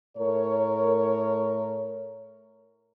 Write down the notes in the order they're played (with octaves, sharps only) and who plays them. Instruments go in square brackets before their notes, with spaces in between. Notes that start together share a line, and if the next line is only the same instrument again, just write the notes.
[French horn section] A2 A#4 C#5